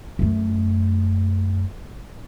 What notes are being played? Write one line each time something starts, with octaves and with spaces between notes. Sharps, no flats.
F#2 A3